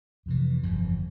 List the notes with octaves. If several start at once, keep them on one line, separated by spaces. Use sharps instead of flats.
F2 C3 E3
G1 F2 C#3 E3